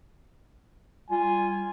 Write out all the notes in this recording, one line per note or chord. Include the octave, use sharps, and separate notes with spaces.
G3 F4 G#5